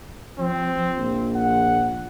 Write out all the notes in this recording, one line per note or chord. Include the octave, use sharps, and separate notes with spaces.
F3 C4
A#1
F#5